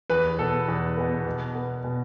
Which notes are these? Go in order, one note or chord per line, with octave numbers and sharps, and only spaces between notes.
E2 B4
B2 B3 A4
E2
B2 B3
B2
B3
B2